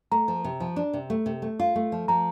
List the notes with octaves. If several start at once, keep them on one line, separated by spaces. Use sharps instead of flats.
A3 A#5
F3
C3
F3
D4
C3
A3
C3
A3
F4
A3
F3
F3 A#5